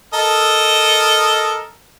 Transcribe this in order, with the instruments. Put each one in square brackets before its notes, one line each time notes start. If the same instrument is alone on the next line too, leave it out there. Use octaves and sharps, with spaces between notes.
[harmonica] A4 A#4 D#5